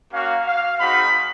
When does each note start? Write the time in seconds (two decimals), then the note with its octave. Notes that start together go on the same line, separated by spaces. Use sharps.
0.13 A#3 C#4 F#4 F5
0.47 F5
0.80 G#3 C4 D#4 F#4 B5